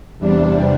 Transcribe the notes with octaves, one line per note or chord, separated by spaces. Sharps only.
E2 C3 G3 D4